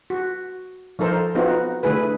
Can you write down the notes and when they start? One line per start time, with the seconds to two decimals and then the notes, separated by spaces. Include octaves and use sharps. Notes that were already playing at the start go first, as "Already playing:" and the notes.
0.10 F#4
0.99 F3 D#4 A4 A#4 C5
1.35 B3 C4 D#4 F4 F#4
1.83 D3 A3 E4 G#4 B4